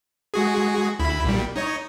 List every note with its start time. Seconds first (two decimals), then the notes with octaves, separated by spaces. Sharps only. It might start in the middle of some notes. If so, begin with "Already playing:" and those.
0.34 G#3 F#4 G#4
0.99 D2 E4 B5
1.24 B1 A#2 G3
1.56 D#4 C#5 D#5